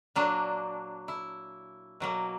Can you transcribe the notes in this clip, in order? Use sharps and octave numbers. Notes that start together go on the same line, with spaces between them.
A#2 F#3 A#3 D4
E4
B2 F#3 A#3